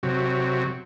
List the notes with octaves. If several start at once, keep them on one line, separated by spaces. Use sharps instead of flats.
C3 F#3